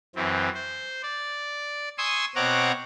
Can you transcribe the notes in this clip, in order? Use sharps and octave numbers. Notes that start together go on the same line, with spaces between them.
F#2 E3 C4
C5
D5
G#5 C6 C#6 D#6 E6
B2 C4 C#5 F#5 A#5 D6